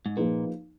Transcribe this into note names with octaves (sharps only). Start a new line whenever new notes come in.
G#2
A#2 F3 A#3 D#4 G#4 B4